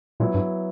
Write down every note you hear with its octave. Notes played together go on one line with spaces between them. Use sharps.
A#2 F#3 B3 E4
G2